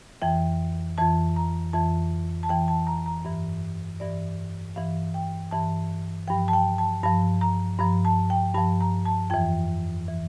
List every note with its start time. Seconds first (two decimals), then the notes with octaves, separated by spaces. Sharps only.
0.22 F2 E3 G5
0.98 F2 E3 A5
1.36 A#5
1.73 F2 E3 A5
2.43 A5
2.49 F2 E3 G5
2.68 A5
2.87 A#5
3.06 A#5
3.25 G2 E3
4.00 G2 E3 D5
4.76 G2 E3 F5
5.14 G5
5.51 G2 E3 A5
6.28 G2 F3 G5
6.48 A5
6.53 G5
6.78 A5
7.03 G2 F3 A5
7.41 A#5
7.79 G2 F3 A#5
8.05 A5
8.30 G5
8.54 G2 F3 A5
8.81 A#5
9.05 A5
9.30 F2 E3 G5
10.08 E3